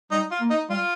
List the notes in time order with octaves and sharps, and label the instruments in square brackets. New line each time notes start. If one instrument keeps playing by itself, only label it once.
[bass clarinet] G3 [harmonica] D#4
[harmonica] F4
[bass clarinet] A#3
[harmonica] D#4
[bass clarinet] G3 [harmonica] F4